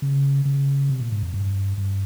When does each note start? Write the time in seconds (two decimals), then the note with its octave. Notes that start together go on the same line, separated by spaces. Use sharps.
0.02 C#3
0.45 C#3
0.89 C3
1.00 A#2
1.12 G#2
1.23 F2
1.34 G2
1.77 G2